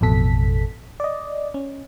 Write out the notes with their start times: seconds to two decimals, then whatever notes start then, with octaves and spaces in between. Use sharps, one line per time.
0.01 A1 F2 B2 A4 B6
1.00 D5 D#5
1.54 C#4